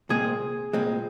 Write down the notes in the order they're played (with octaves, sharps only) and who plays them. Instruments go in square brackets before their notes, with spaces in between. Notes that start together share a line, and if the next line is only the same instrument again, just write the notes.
[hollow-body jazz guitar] C2 A#2 G#3 C4 [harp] G#4
[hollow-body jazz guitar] C2 A#2 G#3 C4